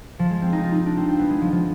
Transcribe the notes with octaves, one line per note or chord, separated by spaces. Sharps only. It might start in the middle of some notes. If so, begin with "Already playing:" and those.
F3
G#3
C4
D#4
F4
D#4
D4
C4
C4
B3
G#3
F3
F3